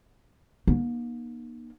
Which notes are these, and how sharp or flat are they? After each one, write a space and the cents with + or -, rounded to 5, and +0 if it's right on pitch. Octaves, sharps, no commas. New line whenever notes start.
A#3 +40 D#4 -30